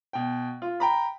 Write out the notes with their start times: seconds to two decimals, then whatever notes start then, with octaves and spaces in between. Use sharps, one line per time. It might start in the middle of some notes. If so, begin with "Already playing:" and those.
0.13 B2 G5
0.62 F4
0.80 G5 A#5 B5